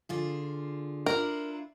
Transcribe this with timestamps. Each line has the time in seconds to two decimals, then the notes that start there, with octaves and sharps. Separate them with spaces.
0.09 D3 F4 G#4
1.06 D4 E4 F4 A#4